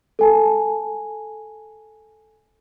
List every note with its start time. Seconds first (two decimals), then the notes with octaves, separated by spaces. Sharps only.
0.19 A4 G#5 A5